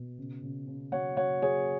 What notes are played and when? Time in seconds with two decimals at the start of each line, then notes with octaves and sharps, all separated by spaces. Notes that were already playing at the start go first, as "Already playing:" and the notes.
Already playing: B2
0.18 C#3
0.43 C#3
0.68 C#3
0.92 F#3 C#5 F#5
1.17 F#3 C#5 F#5
1.42 F#3 G#4 C#5